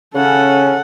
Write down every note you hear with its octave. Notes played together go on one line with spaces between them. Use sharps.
C#3 C#4 A4 F#5